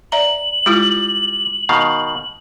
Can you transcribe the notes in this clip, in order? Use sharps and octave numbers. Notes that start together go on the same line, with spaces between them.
D5 E5 A#5 F#7
G3 G#3 E4 F4
B2 D#3 F5